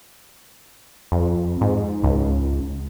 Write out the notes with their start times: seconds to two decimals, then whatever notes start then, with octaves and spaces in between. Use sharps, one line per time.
1.12 F2
1.61 G#2
2.04 C#2